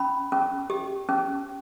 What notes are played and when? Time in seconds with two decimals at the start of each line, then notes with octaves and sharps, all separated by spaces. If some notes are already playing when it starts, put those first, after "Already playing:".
Already playing: C#4 B5
0.32 C#4
0.70 G4
1.09 C#4